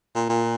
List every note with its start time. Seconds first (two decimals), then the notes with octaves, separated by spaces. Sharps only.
0.15 A#2
0.29 A#2